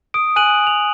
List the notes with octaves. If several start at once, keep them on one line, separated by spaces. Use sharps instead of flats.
D#6 D7
G#5 F#6 D#7 F#7
F7